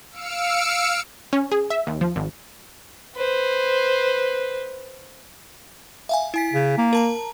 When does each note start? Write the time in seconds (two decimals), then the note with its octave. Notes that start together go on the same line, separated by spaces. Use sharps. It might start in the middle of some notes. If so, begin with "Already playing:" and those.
0.11 F5 E6 F6 C#7 D7
1.33 C#4
1.52 G#4
1.70 E5
1.87 D#2
2.01 F3
2.16 G#1
3.16 B4 C5
6.09 E5 F5 G#5
6.34 E4 G#5 B6
6.53 C#3
6.78 A#3
6.93 A#4 A5 A#5